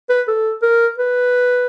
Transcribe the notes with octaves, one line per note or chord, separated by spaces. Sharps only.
B4
A4
A#4
B4